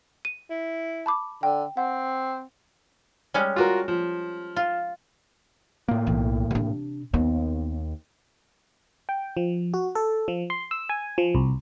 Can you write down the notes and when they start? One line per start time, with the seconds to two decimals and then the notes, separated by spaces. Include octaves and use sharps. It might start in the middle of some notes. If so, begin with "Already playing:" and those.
0.25 D#7
0.50 E4
1.06 A5 B5 D6
1.43 D3 G5
1.77 C4 F#5
3.34 G3 G#3 C#4
3.56 F4 F#4 A#4
3.88 F3
4.56 F4
5.88 A2 A#3
6.07 B1 E3
6.51 C3 D4
7.14 D#2 B3 C4
9.09 G5
9.37 F3
9.74 F#4
9.95 A4
10.28 F3
10.50 C6
10.71 E6
10.89 G#5
11.18 F3
11.35 C2